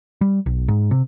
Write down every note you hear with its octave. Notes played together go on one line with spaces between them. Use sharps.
G3
B1
G#2
C3